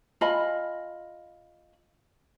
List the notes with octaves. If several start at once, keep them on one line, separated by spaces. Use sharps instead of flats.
F4 D#5 G#5 B5